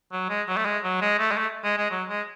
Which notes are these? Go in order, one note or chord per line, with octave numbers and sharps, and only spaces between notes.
F#3
G#3
F#3
A3
G#3
F#3
G#3
A3
G#3
A3
G#3
G#3
F#3
G#3